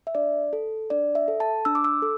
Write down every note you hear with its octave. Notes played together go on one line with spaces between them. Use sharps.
E5
D4 D5
A4
D4 D5
E5
A4
A5
D4 E6
D6
E6
A4